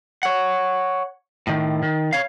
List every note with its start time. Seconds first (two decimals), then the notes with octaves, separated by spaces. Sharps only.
0.23 C#5 F#5
1.47 A2 D#3
1.83 D#3
2.13 C#5 F5